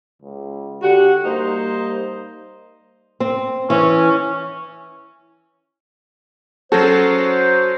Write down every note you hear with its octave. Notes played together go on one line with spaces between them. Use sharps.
C#2
D3 F#4 G4 F#5
G3 A#3 D#4 C5
C4
E3 C#4
F#3 C#4 F#4 A4 C5